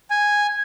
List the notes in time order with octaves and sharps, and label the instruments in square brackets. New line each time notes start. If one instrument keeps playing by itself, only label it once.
[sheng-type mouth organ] G#5